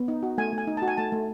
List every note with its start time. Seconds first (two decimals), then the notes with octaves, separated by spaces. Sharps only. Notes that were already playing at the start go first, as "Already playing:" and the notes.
Already playing: B3
0.08 D#4
0.23 F#4
0.38 A3 G#5
0.53 A3 G#5
0.67 D#4
0.77 F#4 A5
0.88 G#5
0.97 A3 A5
1.12 A3